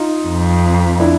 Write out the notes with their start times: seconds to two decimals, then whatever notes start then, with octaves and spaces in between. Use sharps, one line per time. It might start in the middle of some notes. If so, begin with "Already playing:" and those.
Already playing: D#4 F4
0.27 F2
1.00 D4 E4